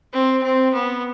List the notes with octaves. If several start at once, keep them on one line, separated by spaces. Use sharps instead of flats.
C4
C4
B3